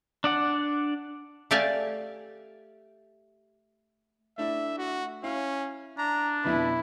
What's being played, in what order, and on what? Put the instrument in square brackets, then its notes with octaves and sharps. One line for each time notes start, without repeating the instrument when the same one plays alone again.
[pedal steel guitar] D4 D5 F#5
[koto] A3 G4 D5 F5 G#5 A5
[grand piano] A3 D4 E4 [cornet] E5
[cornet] F#4
[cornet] C#4 [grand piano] E4 F5
[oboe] D4 [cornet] A#5
[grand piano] F2 B2 D3 [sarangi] E4 [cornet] B4